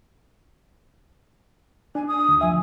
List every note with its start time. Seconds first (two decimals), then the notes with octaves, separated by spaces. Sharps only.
1.95 D4 G#5
2.07 D#6
2.28 D2
2.41 F#2 F3 E5 G#5